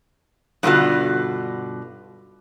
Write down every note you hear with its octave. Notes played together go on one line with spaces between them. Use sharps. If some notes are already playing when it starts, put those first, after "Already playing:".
G2 B2 D3 C4 F4 F#4